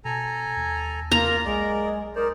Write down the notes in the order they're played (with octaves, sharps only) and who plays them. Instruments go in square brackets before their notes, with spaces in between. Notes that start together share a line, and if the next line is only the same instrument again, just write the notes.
[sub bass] B2 [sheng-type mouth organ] A4 G#5 A#5
[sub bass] D#2
[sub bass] E2 [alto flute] A#3 [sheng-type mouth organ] F4 [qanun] A#5
[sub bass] B1 [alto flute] G#3 [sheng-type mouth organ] A#4 D5
[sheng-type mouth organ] D#4 C5 D5 [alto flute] A#4